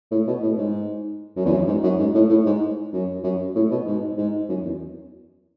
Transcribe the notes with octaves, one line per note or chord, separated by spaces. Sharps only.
A2
B2
A2
G#2
F#2
E2
F#2
G#2
F#2
G#2
A2
A2
G#2
F#2
F#2
A2
B2
G#2
G#2
F#2
E2